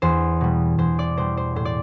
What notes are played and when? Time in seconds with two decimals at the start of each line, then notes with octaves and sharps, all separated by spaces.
0.02 E2 C5
0.41 B2 G3
0.78 E2 C5
0.99 D5
1.17 B2 G3 C5
1.37 C5
1.55 A2 C5
1.65 D5